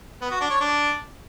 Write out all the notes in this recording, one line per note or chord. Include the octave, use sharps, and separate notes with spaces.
B3
F#4
D4
C#5
D4